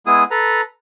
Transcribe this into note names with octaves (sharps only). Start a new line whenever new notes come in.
G#3 B3 E4 G#4 D#6
A4 B4 A#5